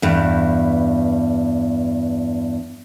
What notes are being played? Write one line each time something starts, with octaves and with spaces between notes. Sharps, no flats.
E2 G2